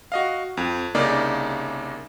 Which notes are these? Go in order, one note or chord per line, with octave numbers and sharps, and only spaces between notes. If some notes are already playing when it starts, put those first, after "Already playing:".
F#4 D#5 F5
F2
C2 C#3 A#3 D#4 D5